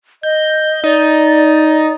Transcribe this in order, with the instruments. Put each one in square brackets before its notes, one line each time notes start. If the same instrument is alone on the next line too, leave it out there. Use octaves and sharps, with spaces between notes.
[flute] D#5 [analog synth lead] G6
[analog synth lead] D#4 [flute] D5